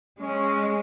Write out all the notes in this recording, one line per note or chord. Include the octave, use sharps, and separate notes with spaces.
G#3 C#4